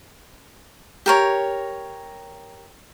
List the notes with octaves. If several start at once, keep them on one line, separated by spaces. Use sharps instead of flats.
G4 A#4 C#5